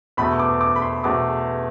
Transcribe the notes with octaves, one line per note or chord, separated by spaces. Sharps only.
E2 B2 A3 B5
D6
D6
B5
C6
E2 B2 A3 D6